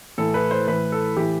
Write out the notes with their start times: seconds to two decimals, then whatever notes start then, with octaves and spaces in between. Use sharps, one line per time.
0.18 A2 E3 A4
0.34 B4
0.51 C5
0.68 A2 E3 B4
0.92 A4
1.17 A2 E3 G4